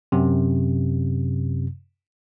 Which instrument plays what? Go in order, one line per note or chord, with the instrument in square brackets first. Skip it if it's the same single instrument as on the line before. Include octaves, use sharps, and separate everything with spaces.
[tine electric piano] F#2 C3